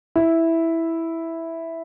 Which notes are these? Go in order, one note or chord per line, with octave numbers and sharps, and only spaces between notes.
E4